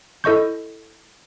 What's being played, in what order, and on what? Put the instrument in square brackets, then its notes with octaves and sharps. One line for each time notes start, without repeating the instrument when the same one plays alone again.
[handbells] E4 A4 D#5 C#6 G6